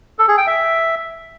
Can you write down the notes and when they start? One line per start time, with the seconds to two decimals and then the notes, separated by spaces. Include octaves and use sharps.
0.19 A4
0.28 G#4
0.38 G5
0.47 E5